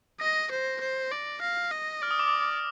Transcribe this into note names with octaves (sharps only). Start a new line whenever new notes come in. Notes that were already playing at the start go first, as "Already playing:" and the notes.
D#5 A#6
C5
C5
D5
F5 A#6
D#5
D5 F6
D#6
D6
D#6